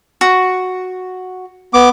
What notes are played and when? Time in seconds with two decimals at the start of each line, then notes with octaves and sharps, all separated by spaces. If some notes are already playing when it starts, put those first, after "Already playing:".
0.21 F#4
1.74 B3 D6